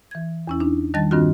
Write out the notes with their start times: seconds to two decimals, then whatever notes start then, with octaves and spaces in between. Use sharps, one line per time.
0.11 E3 G#6
0.47 E2 C#4 E4
0.60 D4 D#4
0.94 D#3 G3 D#5 A5 A6
1.11 G2 D#3 C4 D4 F4 F#4